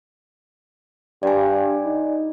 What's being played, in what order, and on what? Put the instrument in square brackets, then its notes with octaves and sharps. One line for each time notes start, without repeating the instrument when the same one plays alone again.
[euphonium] G2 [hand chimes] D5 G#5
[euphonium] D#4